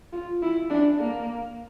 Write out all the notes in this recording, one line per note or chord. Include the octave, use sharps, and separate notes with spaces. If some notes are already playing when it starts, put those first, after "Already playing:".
F4
E4
D4
A#3